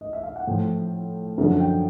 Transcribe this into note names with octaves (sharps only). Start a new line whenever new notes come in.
D#5
E5
F5
F#5
A2 F3 G5
F#2 D3 F3
G5